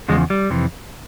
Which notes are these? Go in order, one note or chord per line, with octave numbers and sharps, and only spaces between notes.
E2 C#3 F3 G#3
G3
F2 C3 E3